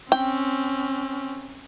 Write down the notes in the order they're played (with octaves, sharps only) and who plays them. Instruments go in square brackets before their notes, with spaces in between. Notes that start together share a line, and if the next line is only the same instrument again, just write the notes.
[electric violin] C4 C#4 [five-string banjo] G5